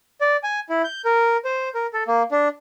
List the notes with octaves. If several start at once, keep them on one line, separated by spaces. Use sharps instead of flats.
D5
G#5
E4
G6
A#4
C5
A#4
A4
A#3
D4